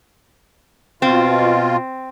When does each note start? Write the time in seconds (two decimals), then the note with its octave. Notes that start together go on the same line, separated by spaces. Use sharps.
1.02 B2 C4 F4